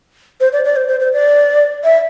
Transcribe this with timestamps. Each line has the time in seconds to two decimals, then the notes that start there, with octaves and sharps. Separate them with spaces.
0.40 C5
0.53 D5
0.65 D5
0.76 C5
0.88 C5
1.00 C5
1.13 D5
1.84 E5